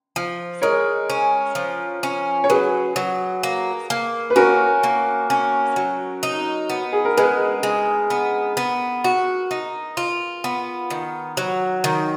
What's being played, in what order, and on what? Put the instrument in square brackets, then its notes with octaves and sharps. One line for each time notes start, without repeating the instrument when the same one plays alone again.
[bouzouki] F3
[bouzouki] G#3 [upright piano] A#4 C#5
[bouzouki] C#4
F3
C#4
[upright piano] C#5
[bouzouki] F#3 [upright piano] G#4 B4
[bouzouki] F#3
A#3
A#3
[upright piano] B4
[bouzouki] C#4 [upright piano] F#4 A#4
[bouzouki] A#3
C#4
F#3
D#4
B3
[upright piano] G#4
A#4
[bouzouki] G#3 [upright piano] G#4 B4
[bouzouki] G#3
B3
B3
F#4
D#4
F4
B3
D#3
F#3
D#3